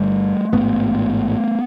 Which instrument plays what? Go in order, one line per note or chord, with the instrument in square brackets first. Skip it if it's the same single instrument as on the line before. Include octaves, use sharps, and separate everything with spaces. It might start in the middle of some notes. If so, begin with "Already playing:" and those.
Already playing: [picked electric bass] G1 G2 D3 G3 A3
A1 G#2 A3 B3